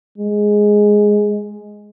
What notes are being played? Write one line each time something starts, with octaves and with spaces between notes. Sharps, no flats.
G#3